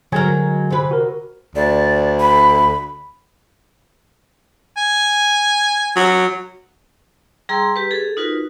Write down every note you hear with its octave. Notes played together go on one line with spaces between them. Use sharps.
D3 F#3 G#3 A#4 G#5 G#6
C3 B4
F#4 A#4
D2 D5
B5
G#5
F#3
G3 G#4 G5 A#5 C6 E6
G4 B4
G#4 A4
D#4 F4 F#4 A#4 B4